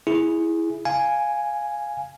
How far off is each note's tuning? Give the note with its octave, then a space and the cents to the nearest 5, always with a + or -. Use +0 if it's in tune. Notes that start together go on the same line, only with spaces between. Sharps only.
E4 +0 G#4 +0
F5 +0 G#5 +0